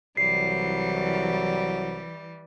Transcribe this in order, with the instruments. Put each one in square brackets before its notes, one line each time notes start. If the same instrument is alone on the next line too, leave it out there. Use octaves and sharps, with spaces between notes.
[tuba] C2 [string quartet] E3 G3 [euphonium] F#3 [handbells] C7